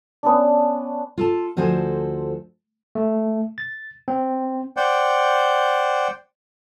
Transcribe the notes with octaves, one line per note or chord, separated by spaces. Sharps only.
B3 C#4 D4
F4 A4 A5
D2 F3 F#4 A4 C5 G#5
A3
A6
C4
C5 D5 F#5 G5